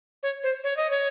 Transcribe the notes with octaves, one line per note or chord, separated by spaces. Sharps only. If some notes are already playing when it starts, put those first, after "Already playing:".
C#5
C5
C#5
D#5
C#5